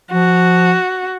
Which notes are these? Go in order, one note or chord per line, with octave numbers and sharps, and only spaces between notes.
F3 F#4